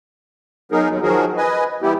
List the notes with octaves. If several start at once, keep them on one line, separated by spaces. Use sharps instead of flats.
F#3 B3 D#4 G#4 A#4
D#2 F#3
D#3 F3 F#3 F#4 G#4 A#4
B4 D#5 G#5
E3 G3 B3 E4 G4